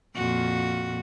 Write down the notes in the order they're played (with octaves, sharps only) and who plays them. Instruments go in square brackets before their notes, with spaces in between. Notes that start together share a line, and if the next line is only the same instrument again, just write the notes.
[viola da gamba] F2 A#2 F#4